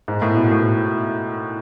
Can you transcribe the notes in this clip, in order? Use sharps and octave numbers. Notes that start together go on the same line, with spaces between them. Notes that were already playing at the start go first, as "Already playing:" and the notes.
G#2
A2
B2
A2